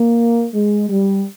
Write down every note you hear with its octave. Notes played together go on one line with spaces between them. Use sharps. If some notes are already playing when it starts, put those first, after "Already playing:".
Already playing: A#3
G#3
G3